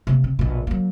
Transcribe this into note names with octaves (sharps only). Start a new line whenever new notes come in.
C3 A#3
C3
A#1 B2
F#3 A#3